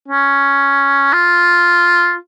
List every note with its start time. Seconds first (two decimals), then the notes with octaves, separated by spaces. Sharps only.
0.08 C#4
1.13 F4